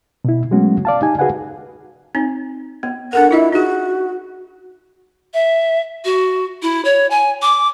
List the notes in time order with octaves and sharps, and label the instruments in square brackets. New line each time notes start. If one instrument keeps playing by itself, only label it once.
[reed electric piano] B2 E4
F#3 G#3 A3 B3 C#4 F#4
D5 F5 A5
D#4 G4 G#5
F#4 G#4 B4 F5 F#5 G#5
[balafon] C4 D#4
B3
[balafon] D4 A4 A#4 [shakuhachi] F#5
[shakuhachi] E4 [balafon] F4 D#5 E5
[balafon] D#4 G#4 [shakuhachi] F#4
[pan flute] E5
F#4
E4
C#5
G#5
D6